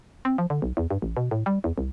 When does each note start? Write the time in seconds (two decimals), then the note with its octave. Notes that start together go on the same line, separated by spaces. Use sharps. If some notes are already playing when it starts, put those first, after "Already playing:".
0.25 C4
0.38 F3
0.50 D3
0.62 B1
0.77 E2
0.91 G2
1.02 A1
1.17 B2
1.31 A2
1.46 G3
1.64 E2
1.78 C2